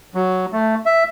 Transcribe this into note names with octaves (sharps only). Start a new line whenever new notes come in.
F#3
A3
E5